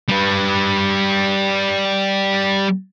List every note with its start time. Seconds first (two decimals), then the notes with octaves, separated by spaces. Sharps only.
0.09 G3 B4